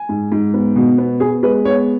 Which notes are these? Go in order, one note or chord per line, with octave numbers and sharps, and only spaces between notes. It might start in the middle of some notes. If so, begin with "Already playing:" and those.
Already playing: G#5
G#2
G#2
B3
B2
B3
B3 G#4
G#3 B4
B3 C#5